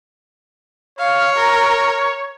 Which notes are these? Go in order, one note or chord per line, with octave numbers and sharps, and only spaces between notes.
C#5 F5
A#4